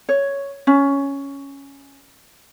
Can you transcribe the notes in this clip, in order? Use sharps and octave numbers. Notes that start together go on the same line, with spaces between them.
C#5
C#4